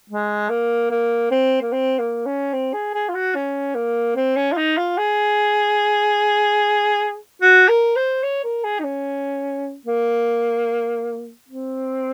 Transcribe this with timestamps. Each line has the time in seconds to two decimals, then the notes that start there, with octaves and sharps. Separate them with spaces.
0.09 G#3
0.49 A#3
0.91 A#3
1.31 C4
1.61 A#3
1.72 C4
1.99 A#3
2.26 C#4
2.54 C4
2.73 G#4
2.94 G#4
3.09 F4
3.15 F#4
3.35 C#4
3.75 A#3
4.16 C4
4.36 C#4
4.52 F4
4.57 D#4
4.77 F4
4.98 G#4
7.42 F#4
7.68 A#4
7.96 C5
8.23 C#5
8.44 A#4
8.64 G#4
8.79 D#4
8.84 C#4
9.86 A#3
11.49 C4